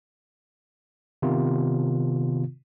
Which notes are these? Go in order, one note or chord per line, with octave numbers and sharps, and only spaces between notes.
C3 D#3 B3 F4